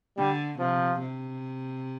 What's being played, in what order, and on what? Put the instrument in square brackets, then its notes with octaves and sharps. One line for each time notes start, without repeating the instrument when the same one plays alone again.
[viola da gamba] D3 [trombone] G3
[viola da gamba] C3 [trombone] F3
[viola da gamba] C3